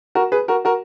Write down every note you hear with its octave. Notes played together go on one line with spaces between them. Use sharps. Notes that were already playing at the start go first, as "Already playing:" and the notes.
F#4 A#4
G#4 B4
F#4 A#4
F#4 A#4